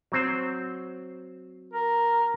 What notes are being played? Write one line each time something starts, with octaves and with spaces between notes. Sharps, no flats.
F#3 C4 C5
A#4